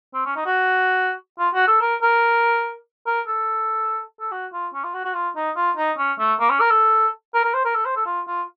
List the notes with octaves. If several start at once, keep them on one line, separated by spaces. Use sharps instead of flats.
C4
C#4
D#4
F#4
F4
F#4
A4
A#4
A#4
A#4
A4
A4
F#4
F4
C#4
F4
F#4
F#4
F4
D#4
F4
D#4
C#4
A3
A#3
C#4
A#4
A4
A#4
A#4
C5
A#4
A4
C5
A4
F4
F4